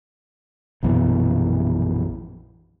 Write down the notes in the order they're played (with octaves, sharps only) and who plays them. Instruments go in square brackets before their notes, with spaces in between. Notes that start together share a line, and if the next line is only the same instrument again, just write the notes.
[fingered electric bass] A#1 F#2 B2 E3